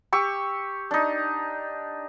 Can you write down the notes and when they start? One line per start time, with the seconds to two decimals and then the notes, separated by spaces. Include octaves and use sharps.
0.13 G4 C#6 E6
0.91 D4 D#4